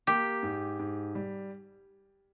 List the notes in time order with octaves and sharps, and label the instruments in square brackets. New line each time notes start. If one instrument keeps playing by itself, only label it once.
[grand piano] A#3 [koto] G4
[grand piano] G#2
G#2
G3